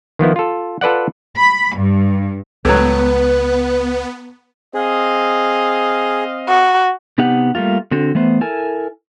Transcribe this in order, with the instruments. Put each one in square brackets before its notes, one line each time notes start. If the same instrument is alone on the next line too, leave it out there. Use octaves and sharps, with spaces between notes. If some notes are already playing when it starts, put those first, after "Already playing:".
[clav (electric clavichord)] D#3 F3 B3 E4
F4 A4
F4 A4 B4 D5 F#5
[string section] B5
G2
[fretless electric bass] C#2 G#3 [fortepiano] A2 F#3 [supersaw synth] B3 [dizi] B4
[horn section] C4 D#5 F5 [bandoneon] G#4
[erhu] F#4
[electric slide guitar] C3 B3 D#4 G4 F#5
G3 A3 A#3 F4
D3 C4 F#4 A4
E3 A3 B3 C5
E4 A4 A#4 G#5